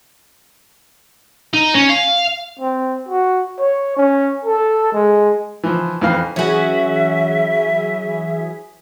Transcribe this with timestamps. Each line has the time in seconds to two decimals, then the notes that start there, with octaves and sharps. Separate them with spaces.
1.54 D#4
1.75 C#4
1.90 F5
2.59 C4
3.09 F#4
3.59 C#5
3.97 C#4
4.45 A4
4.93 G#3
5.64 E3 F3
6.01 F2 E3 F5
6.36 E3 F#3 C#4 F#4 G#4 E5